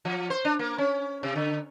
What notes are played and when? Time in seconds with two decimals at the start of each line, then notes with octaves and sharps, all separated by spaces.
0.05 F3
0.30 C5
0.45 D4
0.59 A#3
0.78 C#4
1.23 C3
1.36 D3